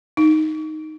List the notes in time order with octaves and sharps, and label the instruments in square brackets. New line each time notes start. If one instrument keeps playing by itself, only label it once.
[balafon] D#4